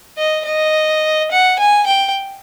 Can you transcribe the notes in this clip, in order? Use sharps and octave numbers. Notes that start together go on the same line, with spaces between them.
D#5
D#5
F#5
G#5
G5